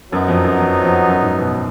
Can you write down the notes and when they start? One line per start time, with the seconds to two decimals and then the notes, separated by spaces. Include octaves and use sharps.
0.12 F#2 F#3 B3 D#4
0.28 F2
0.44 F#2
0.60 F2
0.84 F2
1.08 F#2
1.23 G#2
1.39 B2